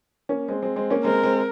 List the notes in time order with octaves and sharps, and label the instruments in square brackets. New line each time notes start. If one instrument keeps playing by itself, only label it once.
[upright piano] A#3 C#4
G#3 C4
G#3 C4
G#3 C4
A#3 C#4
[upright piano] G#3 C4 [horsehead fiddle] A#4
[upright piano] G#3 C4